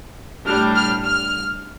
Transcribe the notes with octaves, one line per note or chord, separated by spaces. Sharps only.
A2 G3 D4 F6
F6
F6